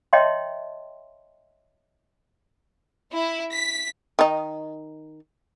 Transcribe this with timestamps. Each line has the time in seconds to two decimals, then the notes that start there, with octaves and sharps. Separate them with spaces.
0.13 C#5 D#5 E5 G5 A5 C6
3.13 E4
3.52 B6
4.19 D#3 D#4